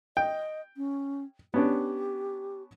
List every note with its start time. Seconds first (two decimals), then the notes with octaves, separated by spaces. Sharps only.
0.17 D#5 G5
0.77 C#4
1.54 B3 C#4 D4 G4